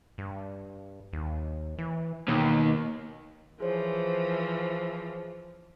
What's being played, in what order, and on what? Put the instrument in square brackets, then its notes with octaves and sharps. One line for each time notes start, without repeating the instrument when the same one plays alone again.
[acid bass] G2
D#2
E3
[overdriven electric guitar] D#2 [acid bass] B2
[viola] E3 F3 [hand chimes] G#4 C5 C#5